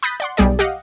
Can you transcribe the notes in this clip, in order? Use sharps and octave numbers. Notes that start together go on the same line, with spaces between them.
B5 D#6 F#6 G6 A6 B6
D5 F#5 C6
B1 G3 G#4 D5
G4 D#5 F5 F#5